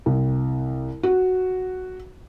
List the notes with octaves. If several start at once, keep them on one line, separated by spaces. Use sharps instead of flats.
C2
F#4